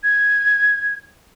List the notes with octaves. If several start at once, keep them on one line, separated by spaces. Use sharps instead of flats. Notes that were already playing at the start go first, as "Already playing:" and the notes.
G#6